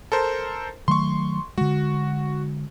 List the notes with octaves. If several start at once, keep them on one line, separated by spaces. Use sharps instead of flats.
A4 A#4 C5
D#3 F#3 A3 C6 C#6
D3 G#3 F#4